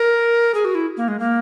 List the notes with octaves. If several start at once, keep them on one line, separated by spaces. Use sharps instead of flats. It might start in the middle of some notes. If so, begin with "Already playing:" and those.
Already playing: A#4
G#4
F#4
E4
A#3
G#3
A#3